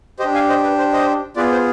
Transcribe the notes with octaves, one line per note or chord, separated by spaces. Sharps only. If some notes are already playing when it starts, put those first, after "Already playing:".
G4 C5 D#5
D4
F5 G#5
C5 D#5
B4
C5
C5 D#5
B3 F4 G#4 B4 D5
C5